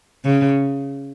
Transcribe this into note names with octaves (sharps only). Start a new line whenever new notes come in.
C#3